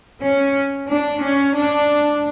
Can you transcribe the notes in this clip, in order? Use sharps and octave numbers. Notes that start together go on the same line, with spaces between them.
C#4
D4
C#4
D4